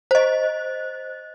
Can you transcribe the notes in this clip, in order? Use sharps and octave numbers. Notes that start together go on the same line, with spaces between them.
C5 D#5